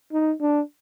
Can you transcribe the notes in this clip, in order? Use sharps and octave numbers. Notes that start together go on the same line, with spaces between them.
D#4
D4